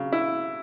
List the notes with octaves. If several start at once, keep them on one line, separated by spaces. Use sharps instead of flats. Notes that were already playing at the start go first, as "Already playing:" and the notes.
Already playing: C#3 F#3
E4